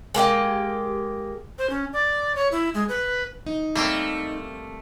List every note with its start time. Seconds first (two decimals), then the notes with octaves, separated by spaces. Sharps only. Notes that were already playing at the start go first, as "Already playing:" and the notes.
0.14 G#3 A#3 G4 D#5
1.58 C5
1.70 C#4
1.93 D5
2.36 C#5
2.52 E4
2.74 G#3
2.89 B4
3.47 D#4
3.75 G3 A3 A#3 C4